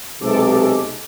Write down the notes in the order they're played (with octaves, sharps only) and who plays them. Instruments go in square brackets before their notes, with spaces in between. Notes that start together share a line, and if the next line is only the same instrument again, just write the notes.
[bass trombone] B1 [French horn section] C3 G#3 [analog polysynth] A4 D6